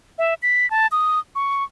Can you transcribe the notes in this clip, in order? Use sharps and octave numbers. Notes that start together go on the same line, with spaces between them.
E5
B6
A5
D#6
C#6